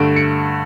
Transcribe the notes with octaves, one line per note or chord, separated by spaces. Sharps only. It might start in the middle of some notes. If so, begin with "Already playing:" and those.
Already playing: G2 D3 A3 D7
C#7